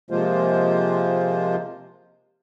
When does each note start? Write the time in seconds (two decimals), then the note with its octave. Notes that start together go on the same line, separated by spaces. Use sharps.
0.11 C3 F3 G#3 A#3 F4 C5